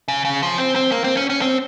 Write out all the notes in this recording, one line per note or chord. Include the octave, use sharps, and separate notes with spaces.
C#3
C#3
F3
C4
C4
A#3
C4
C#4
C#4
C4